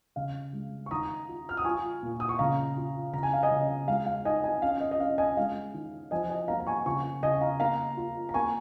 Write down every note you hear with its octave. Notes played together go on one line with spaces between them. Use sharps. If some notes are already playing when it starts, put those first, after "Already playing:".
C#3 F5
G#3
C#6
D#3 A#5 D#6
F4
F6
D#6
F4 G#5 C#6
A#2
D#6
C#6
C#3 F5 A#5
F4
C#3 A#5
G#5
F5
D#5 G#5
C#3
G#3 F5
F5
D#4 D#5 G#5
D#5 G#5
C#4 F5
D#5
D#5
C#4 F5
D#5 G#5
G#3 F5
D#3
F3 D#5 G#5
D#5 G#5
A#3 F5 A#5
A#5
G#5 C#6
C#3 G#5 C#6
C#3 D#5 G#5
F5 A#5
A#3 F5 A#5
F4
A#5
A#3 G#5 C#6